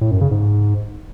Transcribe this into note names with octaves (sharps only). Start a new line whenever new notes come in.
A2
F#2
C#3
G#2